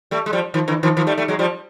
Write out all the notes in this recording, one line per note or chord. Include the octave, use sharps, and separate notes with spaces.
G3 A3
G#3
F3 G3
D#3 F3
D3 E3
D#3 F3
D#3 F3
G3 A3
G3 A3
F#3 G#3
F3 G3